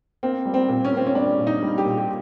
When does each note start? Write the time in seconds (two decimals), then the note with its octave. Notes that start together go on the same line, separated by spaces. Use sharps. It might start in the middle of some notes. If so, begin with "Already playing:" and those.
0.23 A#3 C4
0.46 G3
0.54 C4
0.69 A#2
0.85 C#4
0.92 A#3 C4
1.07 C#4
1.15 G3 D4
1.39 A#2
1.47 D#4
1.63 G3
1.78 G4
1.85 A#2
1.97 G4